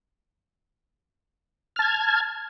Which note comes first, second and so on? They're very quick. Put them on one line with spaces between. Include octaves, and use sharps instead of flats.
F6 A5 G#6